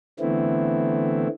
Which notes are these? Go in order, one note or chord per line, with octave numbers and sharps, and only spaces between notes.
D3 E3 A3 B3 C4 E4